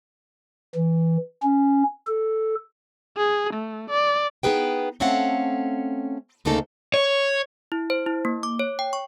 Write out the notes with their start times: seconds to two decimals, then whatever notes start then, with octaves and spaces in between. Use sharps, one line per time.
0.76 E3
1.43 C#4
2.07 A4
3.17 G#4
3.53 A3
3.90 D5
4.43 B3 D#4 G#4 B4 G5
5.00 A3 C4 C#4 A4 F5 F#5
6.45 D2 C#3 A3 A#3 D#4 A4
6.94 C#5
7.72 E4
7.90 C5
8.06 E4
8.25 A#3
8.43 D6
8.59 C#5
8.79 G5
8.93 C#6